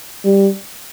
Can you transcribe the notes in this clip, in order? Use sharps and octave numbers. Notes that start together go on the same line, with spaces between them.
G3